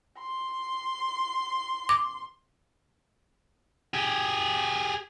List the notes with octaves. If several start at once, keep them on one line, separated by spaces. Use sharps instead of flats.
C6
D6
G4 G#4